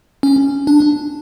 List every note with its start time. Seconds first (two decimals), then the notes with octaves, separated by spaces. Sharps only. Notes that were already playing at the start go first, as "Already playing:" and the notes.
0.23 C#4
0.67 D4